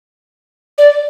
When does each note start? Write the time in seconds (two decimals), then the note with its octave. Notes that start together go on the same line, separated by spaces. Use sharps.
0.78 D5